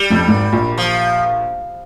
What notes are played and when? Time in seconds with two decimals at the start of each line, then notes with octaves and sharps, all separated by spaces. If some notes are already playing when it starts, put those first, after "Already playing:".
Already playing: G3
0.10 F2 F3
0.27 G#1 G#2
0.52 A#1 A#2
0.78 F3